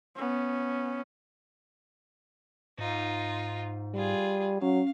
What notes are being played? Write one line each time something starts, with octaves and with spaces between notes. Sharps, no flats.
B3 C#4
G#2 D#4 F4
G3 F4 G#4
F#3 C#4 F5